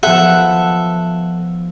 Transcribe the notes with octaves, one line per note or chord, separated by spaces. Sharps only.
F3 B3 A4 E5 F#5